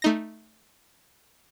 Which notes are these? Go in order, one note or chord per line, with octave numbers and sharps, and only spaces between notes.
A3 D#4 A#6